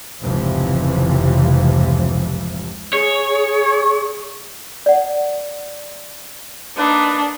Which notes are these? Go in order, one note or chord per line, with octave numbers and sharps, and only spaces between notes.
F1 C#2 G#2 C3 E3 F3
G#4 C#5
D5 F#5
A#3 D4 D#4 B4